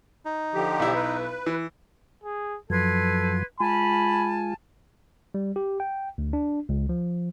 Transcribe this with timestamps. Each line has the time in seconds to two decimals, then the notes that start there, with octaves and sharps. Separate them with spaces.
0.25 D#4
0.54 D3 F3 G4
0.79 B1 E4
0.94 B4
1.46 E3
2.24 G#4
2.70 F#2 F3 F#3 A4 B4 C6 G#6
3.60 G#3 F4 G#5 A5 B5
5.34 G3
5.56 G4
5.80 G5
6.18 D2
6.33 D4
6.69 C#2
6.89 F3